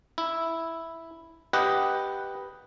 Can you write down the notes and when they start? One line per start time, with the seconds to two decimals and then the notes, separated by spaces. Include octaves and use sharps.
0.18 E4
1.53 G4 B4 D#5 F#5